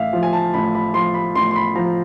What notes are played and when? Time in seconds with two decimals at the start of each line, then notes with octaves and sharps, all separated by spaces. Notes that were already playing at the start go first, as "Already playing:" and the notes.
Already playing: A1 E5 F5
0.13 F3
0.23 G#5
0.33 A5
0.54 A1 B5
0.75 B5
0.94 F3 C6
1.14 B5
1.35 A1 C6
1.51 C6
1.56 B5
1.75 F3 A#5